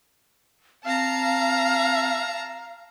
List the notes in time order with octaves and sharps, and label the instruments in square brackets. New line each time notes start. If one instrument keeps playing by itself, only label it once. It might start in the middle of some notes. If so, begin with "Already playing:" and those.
[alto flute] C4 [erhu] F5 [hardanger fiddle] A5 A#5